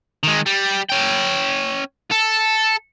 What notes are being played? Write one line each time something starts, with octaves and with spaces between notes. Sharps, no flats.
D#3 G#3
G3
C#4 G5
A4